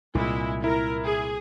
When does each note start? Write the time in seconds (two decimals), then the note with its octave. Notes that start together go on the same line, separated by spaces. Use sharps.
0.15 C2 A#2 G#3 E4
0.64 E4 A#4
1.04 G#4